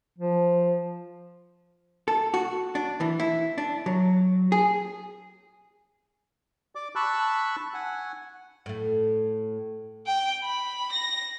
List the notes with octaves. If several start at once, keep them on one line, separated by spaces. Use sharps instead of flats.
F3
A4
F#4
D4
E3
E4
D4
F#3
G#4
D5 D6
A5 B5 C#6 E6 F#6
F#5 G#5
A2 A3
G5
B5
A#6